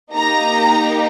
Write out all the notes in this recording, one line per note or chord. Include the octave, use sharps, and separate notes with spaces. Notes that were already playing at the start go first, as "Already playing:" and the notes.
A#3 D#4 G4 A#5